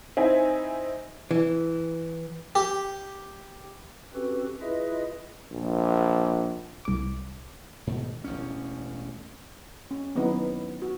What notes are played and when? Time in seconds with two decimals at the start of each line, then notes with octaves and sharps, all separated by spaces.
0.17 C4 D#4 E4 E5 G#5
1.31 E3
2.55 G4
4.14 C4 C#4 F#4 G4 A4 B4
4.61 E4 F4 G#4 B4 D#5 E5
5.52 A#1
6.85 C2 D6
7.87 G#2 B2 D#3
8.24 E1 A1 E2 C#4
9.91 C#4
10.15 D#3 F#3 B3 C4 D#4 E4
10.82 F#4